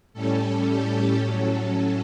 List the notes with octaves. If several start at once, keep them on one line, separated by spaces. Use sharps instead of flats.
A2 G3 C#4 A4
G4
A2 F#3 C#4 A4